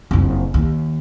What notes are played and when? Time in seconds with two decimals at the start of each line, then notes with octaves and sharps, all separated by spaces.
0.11 F#1 F2
0.54 D#2